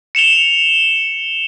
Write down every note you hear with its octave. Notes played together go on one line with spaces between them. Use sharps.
C#7 E7 F7 G7